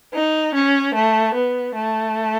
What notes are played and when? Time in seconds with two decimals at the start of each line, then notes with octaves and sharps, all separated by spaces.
0.13 D#4
0.54 C#4
0.94 A3
1.34 B3
1.74 A3